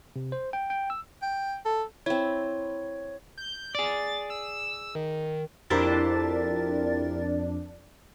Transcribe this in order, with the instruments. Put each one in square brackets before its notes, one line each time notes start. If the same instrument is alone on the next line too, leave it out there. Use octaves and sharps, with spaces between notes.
[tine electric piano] C3
C5
G5
G5
E6
[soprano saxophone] G5
A4
[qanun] C4 E4 [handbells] C#5
[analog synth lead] G6
[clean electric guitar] G#4 D5 [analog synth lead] A6
[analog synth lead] E6
D#3
[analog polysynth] F2 D4 [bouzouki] E4 G4 C5 [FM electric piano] A#4 A6